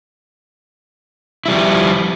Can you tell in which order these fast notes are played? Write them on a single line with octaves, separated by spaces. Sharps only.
E4 G3 F3